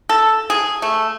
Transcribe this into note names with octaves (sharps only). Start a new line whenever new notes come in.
A4
G#4
A3